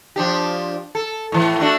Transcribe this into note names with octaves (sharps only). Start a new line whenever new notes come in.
F3 D4 G4
A4
A2 E3
A3 D4 F#4